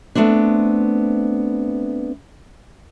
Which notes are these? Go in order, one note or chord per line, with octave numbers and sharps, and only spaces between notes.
A3 B3 C4 D4